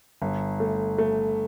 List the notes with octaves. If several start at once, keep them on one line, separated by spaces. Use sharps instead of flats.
G1
A3
A3